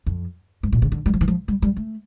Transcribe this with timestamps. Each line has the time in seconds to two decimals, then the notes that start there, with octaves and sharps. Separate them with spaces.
0.07 F2
0.63 G2
0.73 A#2
0.82 C#3
0.92 D3
1.06 G3
1.14 F3
1.21 E3
1.28 F3
1.48 G3
1.62 G3
1.76 A3